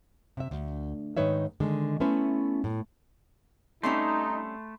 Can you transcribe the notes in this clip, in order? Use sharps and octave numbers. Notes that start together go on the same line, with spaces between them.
C3 E5
D2
G#2 D#3 D#4 B4 C#5 E5
D3 D#3 G#3
A3 B3 C#4 E4 B4 C5
A2
G3 A3 C4 C#4 D#4 B5 C6